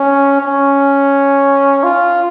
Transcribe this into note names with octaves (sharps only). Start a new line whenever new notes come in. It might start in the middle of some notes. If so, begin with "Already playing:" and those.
Already playing: C#4
C#4
F4